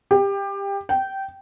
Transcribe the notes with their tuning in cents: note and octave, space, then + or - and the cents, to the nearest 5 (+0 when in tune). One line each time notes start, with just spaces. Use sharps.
G4 +20
G5 -15